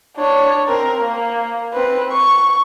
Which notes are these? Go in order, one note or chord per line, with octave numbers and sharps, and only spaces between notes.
D4 C#5
C4 A#4
A#3
C4 B4
C#6